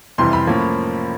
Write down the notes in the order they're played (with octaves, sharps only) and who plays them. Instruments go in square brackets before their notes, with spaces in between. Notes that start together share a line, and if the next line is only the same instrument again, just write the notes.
[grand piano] F2 C3 E3 G3 C6
B5
A2 F3 A#3 C#4